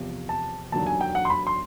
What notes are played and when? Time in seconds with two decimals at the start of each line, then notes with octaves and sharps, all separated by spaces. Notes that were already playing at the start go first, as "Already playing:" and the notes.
Already playing: E2 C3 F3
0.29 A5
0.72 E1 D#2 D3 F#3 A5
0.86 G#5
1.01 G5
1.15 F#5
1.25 C6
1.30 B5
1.47 C6